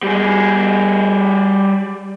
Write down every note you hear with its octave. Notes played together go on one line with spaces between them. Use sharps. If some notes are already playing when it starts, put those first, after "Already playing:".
G3 G#4